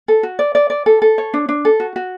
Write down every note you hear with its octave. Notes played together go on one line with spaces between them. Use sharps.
A4
F#4
D5
D5
D5
A4
A4
C#5
D4
D4
A4
F#4
F#4